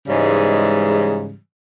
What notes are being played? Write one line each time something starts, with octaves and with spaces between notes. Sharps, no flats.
G#2 C#3 E3 G3 G#3